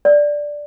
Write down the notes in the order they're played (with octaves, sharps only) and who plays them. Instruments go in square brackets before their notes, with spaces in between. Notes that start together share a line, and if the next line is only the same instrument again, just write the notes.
[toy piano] D5